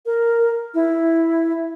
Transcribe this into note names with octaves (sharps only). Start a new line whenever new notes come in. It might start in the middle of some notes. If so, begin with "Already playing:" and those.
A#4
E4